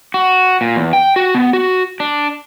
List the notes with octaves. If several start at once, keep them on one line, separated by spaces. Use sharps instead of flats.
F#4
A#2
E2
G5
F#4
B3
F#4
D4